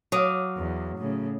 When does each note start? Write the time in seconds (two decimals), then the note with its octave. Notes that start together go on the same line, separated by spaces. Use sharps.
0.12 F#3 F5 D6 D#6
0.58 E2
0.98 A2 C#3